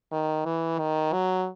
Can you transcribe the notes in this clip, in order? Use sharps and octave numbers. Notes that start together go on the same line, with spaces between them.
D#3
E3
D#3
F#3